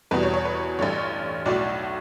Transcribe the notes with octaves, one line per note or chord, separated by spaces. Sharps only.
E2 B2 G3 B4
C#5
C#5
B4
A1 G2 D3 C#5
B1 A2 F#3 D5